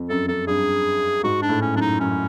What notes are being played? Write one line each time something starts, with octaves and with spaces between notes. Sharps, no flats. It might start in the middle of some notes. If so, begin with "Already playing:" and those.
Already playing: F2
F#2 A4
F#2 A4
G2 G#4
G#2 F#4
D4
A2
C#4
F#2 D4
D#4
F#2 C#4